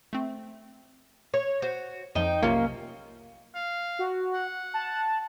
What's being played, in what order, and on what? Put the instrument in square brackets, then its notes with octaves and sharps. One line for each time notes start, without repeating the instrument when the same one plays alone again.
[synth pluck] A3 C4
[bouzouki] C#5
[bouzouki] F#4 [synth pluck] C5
[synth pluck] F2 F3 [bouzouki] D#4 G5
[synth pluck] B1 C3 F4 [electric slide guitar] A#3 [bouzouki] C#4
[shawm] F5
[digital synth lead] F#4
[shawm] F#5
[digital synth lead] A5